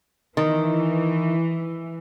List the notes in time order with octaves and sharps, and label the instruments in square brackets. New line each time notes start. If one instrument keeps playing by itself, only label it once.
[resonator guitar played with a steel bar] D#3 [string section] E3